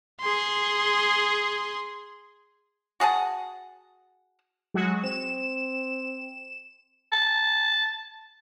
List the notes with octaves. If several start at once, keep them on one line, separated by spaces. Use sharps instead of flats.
G#4 C6
F#4 G#4 F#5 A5
F#3 G#3 F#4
C4 E7
A5